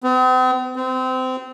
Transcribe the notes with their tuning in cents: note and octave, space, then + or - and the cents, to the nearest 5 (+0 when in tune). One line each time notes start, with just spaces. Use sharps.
C4 -45
C4 -25